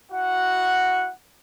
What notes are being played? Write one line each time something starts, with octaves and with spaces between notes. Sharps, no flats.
E4 F#4 F#5